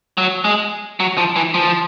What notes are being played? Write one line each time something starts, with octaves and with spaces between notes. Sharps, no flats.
F#3
G#3
F#3
F3
E3
F3